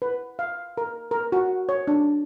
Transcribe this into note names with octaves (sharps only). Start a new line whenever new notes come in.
B4
F5
A#4
A#4
F#4
C#5
D4